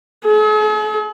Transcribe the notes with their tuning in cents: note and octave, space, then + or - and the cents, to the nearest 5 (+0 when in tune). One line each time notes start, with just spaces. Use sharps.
G#4 +45